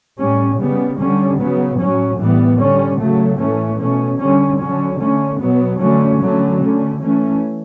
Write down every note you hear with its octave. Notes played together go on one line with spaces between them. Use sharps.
A2 G3 C#4
C#3 G3 B3
D3 G3 C#4
C#3 F#3 B3
A2 F#3 C#4
A2 E3 G3 B3
D3 G3 C#4
C#3 F#3 A3
A2 E3 A3 C#4
B2 A3 C#4
D3 G3 C#4
D3 F#3 C#4
D3 A3 C#4
B2 F#3 B3
D3 F#3 A3 C#4
D3 F#3 A3 C#4
D3 A3 C#4
E3 A3 C#4